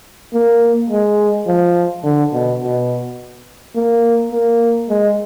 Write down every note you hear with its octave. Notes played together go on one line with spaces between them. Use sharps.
A#3
G#3
F3
D3
B2
B2
A#3
A#3
G#3